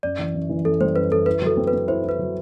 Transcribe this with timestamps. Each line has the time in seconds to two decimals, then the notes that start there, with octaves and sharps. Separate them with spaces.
0.03 F#2 D5
0.19 E3
0.35 F#2
0.49 E3
0.65 F#2 A4
0.80 G3 C5
0.96 F#2 B4
1.11 F#2 A4
1.26 E4 B4
1.42 F#3 A4
1.57 C4
1.67 B4
1.73 C4
1.87 E4 C5
2.03 E4
2.09 B4
2.19 F#3